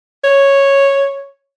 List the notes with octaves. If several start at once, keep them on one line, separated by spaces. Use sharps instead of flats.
C#5